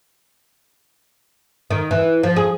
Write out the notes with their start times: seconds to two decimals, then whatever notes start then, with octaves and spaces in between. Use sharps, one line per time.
1.71 D#3
1.91 E3
2.23 F3
2.36 G#4